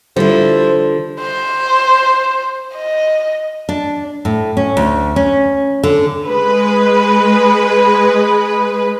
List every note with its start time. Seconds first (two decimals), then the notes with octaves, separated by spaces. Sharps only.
0.16 D3 F3 G3 E4 C5
1.21 C5
2.76 D#5
3.69 D4
4.25 A2
4.57 C#4
4.77 D2
5.16 C#4
5.83 D3
6.28 G#3 B4